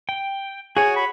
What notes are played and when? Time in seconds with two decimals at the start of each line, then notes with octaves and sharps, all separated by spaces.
0.09 G5
0.77 F#4 G#4 C#5 G#5
0.96 B5